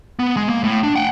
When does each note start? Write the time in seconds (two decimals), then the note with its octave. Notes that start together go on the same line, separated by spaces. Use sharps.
0.19 B3
0.37 G#3
0.49 A#3
0.64 A2
0.83 D4
0.96 F#5 G5